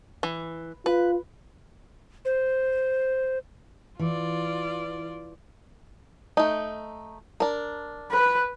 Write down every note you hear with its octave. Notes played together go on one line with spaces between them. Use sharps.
E3
F4 B4
C5
E3 F4 D5
A3 D#4
D4 A#4
B4